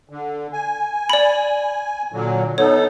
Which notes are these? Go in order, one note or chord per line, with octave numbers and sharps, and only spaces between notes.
D3
G#5
D5 B5
A#2 D3 F#3
B3 D#4 A4 C#5